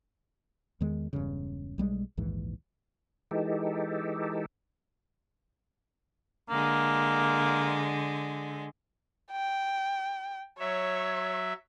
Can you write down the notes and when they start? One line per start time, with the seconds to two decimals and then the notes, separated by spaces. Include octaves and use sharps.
0.80 E2 D#3 G#3
1.13 E1 A#1 G2 C#3
1.78 B1 G3 G#3
2.17 A#1 D#2 G#2 E3
3.31 E3 G#3 D#4 G4 A4
6.50 D3 G#3 A#3
9.32 G5
10.59 F#3 C#5 E5